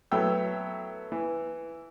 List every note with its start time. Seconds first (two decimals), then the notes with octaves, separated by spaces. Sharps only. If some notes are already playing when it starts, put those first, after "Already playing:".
0.11 F#3 A3 B3 E4 G5 E6
1.12 E3